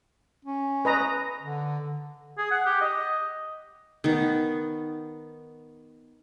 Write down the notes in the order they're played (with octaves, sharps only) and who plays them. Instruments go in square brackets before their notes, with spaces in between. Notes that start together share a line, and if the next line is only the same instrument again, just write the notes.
[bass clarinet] C#4
[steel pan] B4 D#5 A#5
[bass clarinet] D3
[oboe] G#4
F#5
G4
D#5
[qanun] D#3 B3